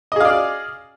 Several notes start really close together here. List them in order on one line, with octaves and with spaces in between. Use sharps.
D#5 G#4 F5 D5